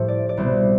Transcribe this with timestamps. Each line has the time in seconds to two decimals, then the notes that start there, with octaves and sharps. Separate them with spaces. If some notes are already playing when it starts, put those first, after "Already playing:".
Already playing: A2 F3 A3 G4 C5
0.08 D5
0.29 D5
0.37 C2 B2 B3 C5